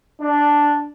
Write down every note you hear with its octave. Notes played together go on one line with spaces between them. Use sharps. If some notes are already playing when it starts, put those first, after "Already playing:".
D4